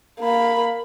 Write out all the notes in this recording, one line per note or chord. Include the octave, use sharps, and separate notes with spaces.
A#3 B5